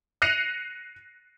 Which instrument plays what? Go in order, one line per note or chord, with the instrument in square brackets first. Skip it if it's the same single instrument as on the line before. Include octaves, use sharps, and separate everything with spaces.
[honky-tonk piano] F#6 A#6 C7 C#7 D#7 F7